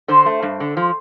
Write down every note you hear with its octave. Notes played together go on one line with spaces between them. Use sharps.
D3 C5
A3
G2
D3
F3